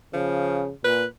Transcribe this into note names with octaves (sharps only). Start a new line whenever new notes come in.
C#3 F3
A#2 B4